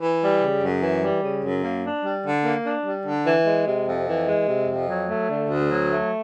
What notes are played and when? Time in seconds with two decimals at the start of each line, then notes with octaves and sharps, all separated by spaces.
0.01 E3
0.22 G3
0.43 C#3
0.62 F#2
0.83 E3
1.02 G3
1.23 C#3
1.43 F#2
1.64 A#3
1.84 D4
2.04 G3
2.25 D3
2.45 A#3
2.65 D4
2.86 G3
3.05 D3
3.26 E3
3.46 G#3
3.67 C3
3.87 F2
4.08 E3
4.28 G#3
4.48 C3
4.68 F2
4.89 F#3
5.09 A3
5.30 D3
5.49 D2
5.69 F#3
5.91 A3